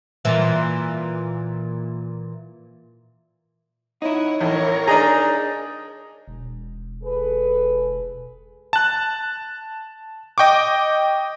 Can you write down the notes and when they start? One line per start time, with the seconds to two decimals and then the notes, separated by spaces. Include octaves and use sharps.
0.25 A#2 E3
4.02 D#4 E4 C#5 F#5
4.40 A1 A#4 C#5
4.88 D4 D#4 G#4 D#5 A#5
6.28 E1
7.03 G#4 A4 B4
8.73 A5 F#6
10.38 D#5 G5 C#6 D6